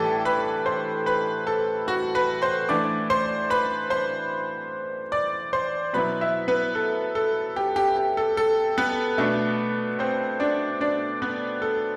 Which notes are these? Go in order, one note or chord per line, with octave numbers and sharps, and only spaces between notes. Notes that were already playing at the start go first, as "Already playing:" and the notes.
Already playing: A2 E3 G3 D4 G4 A4 A5
B4 B5
C5 C6
B4 B5
A4 A5
F#4 F#5
B4 B5
C5 C6
E3 A3 D4 D5 D6
C5 C6
B4 B5
C5 C6
D5 D6
C5 C6
B2 F#3 B3 E4 B4 B5
E4 E5
B3 B4
A4
A4
G4
G4
G4
A4
A4
B3 B4
B2 A3 D4
C4 C5
D4 D5
D4 D5
B3 B4
A4